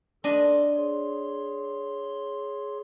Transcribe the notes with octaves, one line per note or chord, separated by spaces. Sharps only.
D4 A4 D#5 C6
G#4 C#5 C6